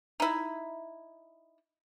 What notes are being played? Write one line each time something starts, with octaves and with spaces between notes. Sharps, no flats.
D#4 E4